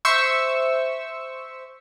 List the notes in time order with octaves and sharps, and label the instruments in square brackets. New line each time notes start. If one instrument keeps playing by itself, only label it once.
[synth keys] C5 E5 C#6 E6